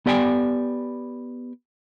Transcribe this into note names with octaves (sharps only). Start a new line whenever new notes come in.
B3 G4 D5 G5 G#5